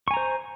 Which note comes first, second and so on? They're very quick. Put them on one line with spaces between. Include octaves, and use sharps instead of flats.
C#6 G#5 A#5 C5